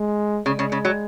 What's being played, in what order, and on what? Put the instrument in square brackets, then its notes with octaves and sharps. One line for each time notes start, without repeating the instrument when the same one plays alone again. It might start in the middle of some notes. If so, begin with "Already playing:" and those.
Already playing: [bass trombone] G#3
[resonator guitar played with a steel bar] C#3 [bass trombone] G#3
[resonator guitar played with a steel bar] C#3
C#3
F#3